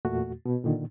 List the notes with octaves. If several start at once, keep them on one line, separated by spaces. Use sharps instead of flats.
E2 A#2 A3 F#4
B2
A#2 D3 D#3